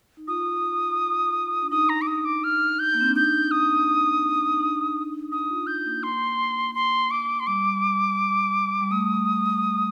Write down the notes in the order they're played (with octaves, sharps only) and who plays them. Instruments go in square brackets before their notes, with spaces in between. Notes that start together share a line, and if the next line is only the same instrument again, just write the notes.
[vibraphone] D#4
[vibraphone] F4 [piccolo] D#6
[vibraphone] D4
[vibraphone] D#4 [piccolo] D#6
[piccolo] A#5
D6
D#6
D6
F6
G6
[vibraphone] A#3
C4
D4
[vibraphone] D#4 [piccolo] G6
[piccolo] D#6
[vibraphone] D#4
D4
D4
D4
D#4
[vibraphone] D4 [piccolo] D#6
[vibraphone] F4
[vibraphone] D#4 [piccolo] G6
[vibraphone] A#3
[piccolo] C6
C6
D6
C6
[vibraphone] G3 [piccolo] D6
[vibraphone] G3
[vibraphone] A3 [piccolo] D#6